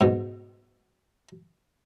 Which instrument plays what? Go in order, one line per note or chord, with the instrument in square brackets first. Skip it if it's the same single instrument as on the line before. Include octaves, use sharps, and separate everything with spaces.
[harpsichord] G#2 B2